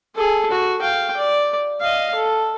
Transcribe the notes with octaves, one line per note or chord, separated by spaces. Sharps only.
G#4 A4
F#4
F5 G5
D5
D#5 F5
A4